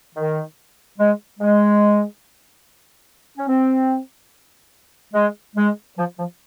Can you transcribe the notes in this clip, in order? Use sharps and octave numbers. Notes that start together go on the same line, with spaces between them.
D#3
G#3
G#3
C#4
C4
G#3
G#3
F3
F3